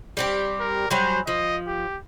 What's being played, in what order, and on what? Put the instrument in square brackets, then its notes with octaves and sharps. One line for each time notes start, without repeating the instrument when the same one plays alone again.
[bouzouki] G3 C4 G4
[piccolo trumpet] A#4
[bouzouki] F#3 G3 G#5 [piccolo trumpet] C5
[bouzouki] F3 [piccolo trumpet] D#5
[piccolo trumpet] G4